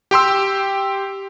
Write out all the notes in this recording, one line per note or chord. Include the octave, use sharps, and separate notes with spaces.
G4 G5 C6 E6